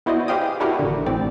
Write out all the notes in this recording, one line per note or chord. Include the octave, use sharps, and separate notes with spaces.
B3 E4 F#4 C5 D5 D#5
G4 G#4 C5 F5 G5 D#6
D4 E4 F#4 G4 A#4 B4
A1 D3
A1 A2 C4 D5